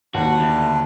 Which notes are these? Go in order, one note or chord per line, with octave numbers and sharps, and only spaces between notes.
D#2 D4 F#4 B4
D2